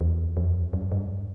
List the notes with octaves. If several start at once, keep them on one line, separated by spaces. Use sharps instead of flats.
E2
F2
F#2
G2